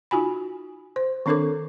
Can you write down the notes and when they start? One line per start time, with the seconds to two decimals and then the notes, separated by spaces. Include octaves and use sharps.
0.11 D#4 F4 F#4 G#5 B5
0.96 C5
1.26 D#3 C4 D4 A4 A#4 D6